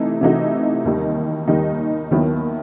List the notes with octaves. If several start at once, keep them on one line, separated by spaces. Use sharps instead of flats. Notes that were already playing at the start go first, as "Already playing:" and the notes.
Already playing: C3 E3 A3 D#4
C3 E3 A3 D#4 F#4
D#2 D#3 G3 D#4
D#2 D#3 G3 D#4
D#2 D#3 F#3 B3 E4